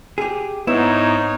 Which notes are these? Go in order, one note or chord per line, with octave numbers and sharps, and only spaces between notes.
G4 G#4
G#2 B3 D#4 E4 C#5